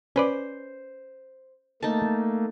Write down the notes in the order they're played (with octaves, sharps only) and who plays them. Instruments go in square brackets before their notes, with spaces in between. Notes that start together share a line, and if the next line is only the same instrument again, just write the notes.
[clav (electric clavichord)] C#4 B4 D5 [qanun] C5
[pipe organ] A3 A#3 [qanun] D#4 A5